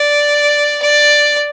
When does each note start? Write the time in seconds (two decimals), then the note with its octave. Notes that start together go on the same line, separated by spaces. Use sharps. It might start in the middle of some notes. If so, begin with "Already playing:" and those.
Already playing: D5
0.83 D5